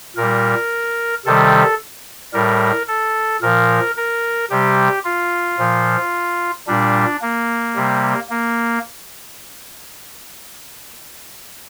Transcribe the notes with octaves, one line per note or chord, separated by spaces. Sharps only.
A#2 G3 A#4
C3 D#3 G3 A4
A2 G3 A#4
A4
A#2 F3 A#4
A#4
C3 G3 G4
F4
A#2 F3
A#2 G3 D4
A#3
C3 G3
A#3